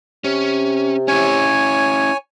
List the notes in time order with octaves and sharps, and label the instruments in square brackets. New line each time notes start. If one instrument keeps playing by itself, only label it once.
[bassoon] C3 [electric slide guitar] C#4
[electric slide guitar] C#4 E4 [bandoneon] C#5 G#5